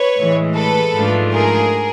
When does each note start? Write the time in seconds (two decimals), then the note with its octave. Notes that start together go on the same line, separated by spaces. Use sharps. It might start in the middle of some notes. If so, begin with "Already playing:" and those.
Already playing: B4 C#5
0.16 A2 E3 G#3
0.55 A4 B4
0.94 G#2 F3 A3 D4 F4
1.33 G#4 A#4